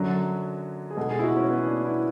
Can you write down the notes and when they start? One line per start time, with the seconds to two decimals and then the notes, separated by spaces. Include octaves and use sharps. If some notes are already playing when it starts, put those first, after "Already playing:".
Already playing: F#2 D3 F#3
0.90 G#4
0.97 B2 G#3 A4
1.10 G#4
1.19 E4
1.24 F#4
1.36 C#4
1.50 B3
1.67 D4
1.85 E4